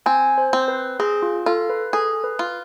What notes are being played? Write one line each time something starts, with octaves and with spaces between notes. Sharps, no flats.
C4 G#5
C5
C4
B4
C4 G#4
F4
F4 A4
B4
G#4 A4
B4
F4